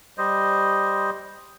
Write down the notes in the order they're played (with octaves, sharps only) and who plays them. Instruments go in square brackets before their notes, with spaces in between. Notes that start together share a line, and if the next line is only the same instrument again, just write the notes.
[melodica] G3 C5 D#5